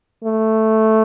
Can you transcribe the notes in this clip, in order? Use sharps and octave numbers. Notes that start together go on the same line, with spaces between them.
A3